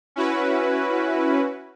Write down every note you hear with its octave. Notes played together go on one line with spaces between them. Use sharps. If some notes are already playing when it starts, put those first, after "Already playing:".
C#4 E4 F#4 B4